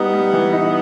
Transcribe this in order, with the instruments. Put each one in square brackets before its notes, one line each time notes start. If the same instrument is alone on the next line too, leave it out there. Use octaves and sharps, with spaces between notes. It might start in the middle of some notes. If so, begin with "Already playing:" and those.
Already playing: [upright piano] G3 D#4 [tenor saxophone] B3
[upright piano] G3
E3
D#4